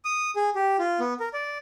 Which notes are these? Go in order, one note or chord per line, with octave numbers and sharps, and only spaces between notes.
D#6
G#4
G4
F4
B3
A#4
D5